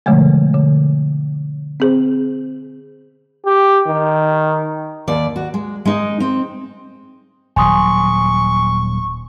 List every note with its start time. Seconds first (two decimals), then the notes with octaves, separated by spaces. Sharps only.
0.06 B2 D3 F3 G#3 A3
0.54 D3
1.80 C4 G#4 C5
3.46 G4
3.87 D#3
5.08 D#2 D5
5.36 F#4
5.54 G#3
5.85 G#3 D#4
6.20 C4
7.56 D#1 F#3 G#5 C6 C#6 D#6